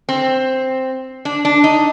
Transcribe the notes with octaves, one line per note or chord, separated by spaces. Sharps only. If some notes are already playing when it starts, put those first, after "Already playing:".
C4
D4
D4
D#4